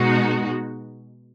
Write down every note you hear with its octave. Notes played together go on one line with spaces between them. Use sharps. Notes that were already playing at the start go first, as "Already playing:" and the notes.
Already playing: B2 G#3 D#4 F#4